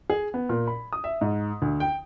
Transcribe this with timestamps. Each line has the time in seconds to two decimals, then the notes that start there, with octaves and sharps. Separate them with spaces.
0.10 G#4
0.34 B3
0.49 A#2
0.67 B5
0.93 D#6
1.04 E5
1.21 G#2
1.62 D2
1.80 G5